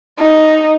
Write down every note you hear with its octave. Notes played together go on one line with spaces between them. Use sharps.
D#4